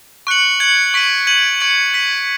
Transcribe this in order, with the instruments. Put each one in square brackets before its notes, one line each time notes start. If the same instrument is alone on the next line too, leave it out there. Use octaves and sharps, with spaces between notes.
[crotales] C#6 F#6 C#7 F#7
G#6 C#7 F#7
C#6 B6 D#7
G#6 D#7 F#7
C#6 G#6 C#7 F#7
G#6 B6 D#7